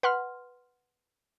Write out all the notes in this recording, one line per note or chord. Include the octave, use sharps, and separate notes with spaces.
B4 F#5 C6 F6